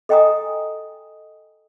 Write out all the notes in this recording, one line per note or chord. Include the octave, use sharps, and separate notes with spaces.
A4 D#5 G5 G#5 A#5 D#6